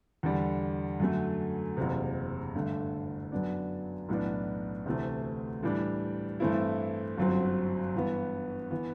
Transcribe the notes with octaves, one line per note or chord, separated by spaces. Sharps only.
E2 D3 G3
F#2 D3 F#3 A3
F#1 E2 C3
G2 D3 A3
F#2 F#3 B3 D4
B1 A2 E3 B3 D4
D2 C3 E3 A3
A2 E3 G3 D4
G2 E3 A3 C4 E4
G1 F#2 F#3 C4
G2 E3 B3
E3 B3